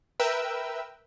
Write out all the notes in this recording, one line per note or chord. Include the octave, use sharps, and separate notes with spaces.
A#4 B4 E5 G5 E6